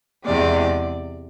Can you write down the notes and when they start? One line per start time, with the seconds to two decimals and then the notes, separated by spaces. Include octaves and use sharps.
0.25 E2 C3 G#3 D5